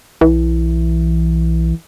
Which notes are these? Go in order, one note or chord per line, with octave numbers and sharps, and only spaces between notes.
B1 E3